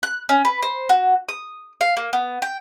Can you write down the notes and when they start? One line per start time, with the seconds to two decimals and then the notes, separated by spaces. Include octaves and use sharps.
0.03 F#6
0.29 C#4
0.45 B4
0.62 C5
0.89 F#4
1.29 D#6
1.81 F5
1.97 A#3
2.13 B3
2.42 G5